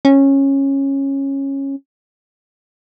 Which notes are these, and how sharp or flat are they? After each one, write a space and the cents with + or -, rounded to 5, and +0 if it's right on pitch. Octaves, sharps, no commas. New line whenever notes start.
C#4 -15